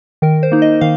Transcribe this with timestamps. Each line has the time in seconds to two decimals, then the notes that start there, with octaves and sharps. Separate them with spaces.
0.22 D#3 A#4
0.43 C5
0.52 A#3 D#4
0.62 D#5
0.81 D#3 F5